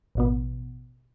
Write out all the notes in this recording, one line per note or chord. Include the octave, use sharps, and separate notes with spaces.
A1 B2 B3